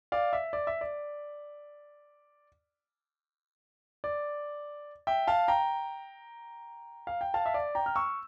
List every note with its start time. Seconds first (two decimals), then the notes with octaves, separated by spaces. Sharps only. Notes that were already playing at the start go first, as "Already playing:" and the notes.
0.12 D5 F5
0.33 E5
0.53 D5
0.67 E5
0.81 D5
4.04 D5
5.07 E5 G5
5.27 F5 A5
5.48 G5 A#5
7.07 F5
7.21 G5
7.34 F5 A5
7.46 E5
7.54 D5
7.75 G5 A#5
7.86 F6
7.96 C#6 E6